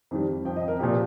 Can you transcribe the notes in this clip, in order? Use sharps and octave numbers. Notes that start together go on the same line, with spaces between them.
F2 D#3 G3
F2 F3 G5
D#5
A#4
A#2 F3 G4